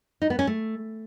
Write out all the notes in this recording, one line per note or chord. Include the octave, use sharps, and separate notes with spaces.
D#4
B3
C#4
A3